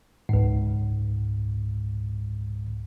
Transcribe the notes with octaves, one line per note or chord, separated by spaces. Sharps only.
C#2 G#2